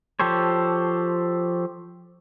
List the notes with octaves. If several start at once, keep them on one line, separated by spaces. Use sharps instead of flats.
F3 G4 A4 C5 C#5